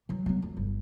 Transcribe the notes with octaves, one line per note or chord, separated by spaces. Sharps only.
E3 F#3
F#3 B3
F2
G1